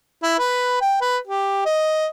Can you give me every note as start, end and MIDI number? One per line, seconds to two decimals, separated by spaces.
0.23 0.38 64
0.39 0.80 71
0.82 0.97 79
1.01 1.18 71
1.27 1.65 67
1.66 2.07 75